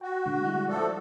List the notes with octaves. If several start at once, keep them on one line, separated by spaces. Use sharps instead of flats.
F#4 G5
A#2 D3 G#3
G3 G#3 E4
F3 A3 A4 D5